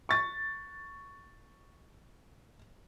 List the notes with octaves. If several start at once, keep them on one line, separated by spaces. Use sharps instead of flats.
C#6 A6